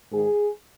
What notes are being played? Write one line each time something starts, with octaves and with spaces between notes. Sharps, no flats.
G#2 D#3 G#4